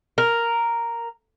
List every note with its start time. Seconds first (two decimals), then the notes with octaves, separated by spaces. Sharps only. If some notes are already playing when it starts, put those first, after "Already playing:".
0.18 A#4